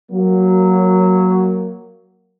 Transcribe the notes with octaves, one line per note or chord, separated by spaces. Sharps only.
F#3 A#3